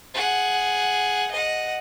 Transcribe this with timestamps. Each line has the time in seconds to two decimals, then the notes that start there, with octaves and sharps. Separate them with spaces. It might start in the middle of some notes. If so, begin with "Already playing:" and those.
0.14 G#4 F#5
1.31 D#5 F#5